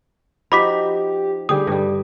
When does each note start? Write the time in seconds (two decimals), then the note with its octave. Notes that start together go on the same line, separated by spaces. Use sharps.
0.52 F3 D#4 F#4 G4 B5 D6 B6
1.49 D3 G3 G4 G#4 D#6
1.67 G2 G3